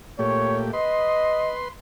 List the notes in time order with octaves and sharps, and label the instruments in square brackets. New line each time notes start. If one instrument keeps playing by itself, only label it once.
[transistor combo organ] A#2 A3 G4 [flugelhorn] C#5
[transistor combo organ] B4 C6 [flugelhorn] D#5